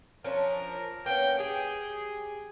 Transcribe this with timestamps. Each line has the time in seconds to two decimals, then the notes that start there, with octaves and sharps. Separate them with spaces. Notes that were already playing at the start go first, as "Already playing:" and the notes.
0.25 F3 C#4 D4 A#4
1.06 A#3 B3 C#4 G5
1.39 G4 G#4